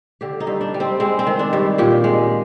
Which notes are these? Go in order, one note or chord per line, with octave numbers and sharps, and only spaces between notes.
D3 G4
D#4
G2
D4
G3
C4
G#3 C4
C4
D#3
D4
G2
A#2 G4
G#3